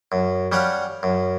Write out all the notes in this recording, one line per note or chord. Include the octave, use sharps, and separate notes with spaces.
F#2
G3 C#4 G4 F5 F#5
F#2